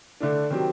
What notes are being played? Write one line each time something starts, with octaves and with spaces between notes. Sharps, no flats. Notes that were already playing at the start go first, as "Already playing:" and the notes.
D3 A3 D4
D#3 F#3 C4 G4